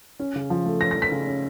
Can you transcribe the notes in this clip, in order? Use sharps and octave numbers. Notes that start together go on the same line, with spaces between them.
C#4
C#3
F3
A3
C#4 A#6
A#6
F3
B6
C#3
C#4